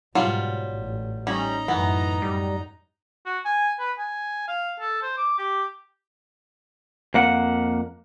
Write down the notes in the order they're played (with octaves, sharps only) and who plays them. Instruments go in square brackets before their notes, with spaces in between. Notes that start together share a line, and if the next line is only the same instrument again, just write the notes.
[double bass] G#2 B2 [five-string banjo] F#3 G3 F4
[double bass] A1
[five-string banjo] G3 [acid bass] C#4 [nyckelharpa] D#4 A#5
[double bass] F#2 A2 [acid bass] E3 [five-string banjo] B3
[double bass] F#2 [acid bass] G3
[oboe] F#4
G#5
B4
G#5
F5
A4
C5
D6
G4
[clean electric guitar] F2 A#3 F#5